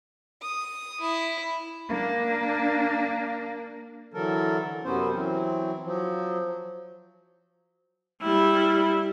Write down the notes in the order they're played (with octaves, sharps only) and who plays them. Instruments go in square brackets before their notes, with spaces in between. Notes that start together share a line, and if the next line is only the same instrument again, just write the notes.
[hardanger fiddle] D#6
E4
[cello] A#3 D4
[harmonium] D3 E3 F#3 A4 A#4
F#2 C3 B3 C#4 C5
E3 F#3 C4
F3 F#3
[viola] G3 E4